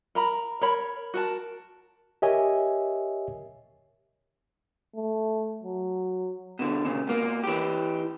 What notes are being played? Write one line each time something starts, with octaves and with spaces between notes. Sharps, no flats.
A#4 A#5 B5
A#4 C#5 B5
F#4 A#4 A5
G4 A#4 C#5 D#5 E5 G#5
A3
F#3
B2 D3
A#2 C#3
B2 A#3
E3 G4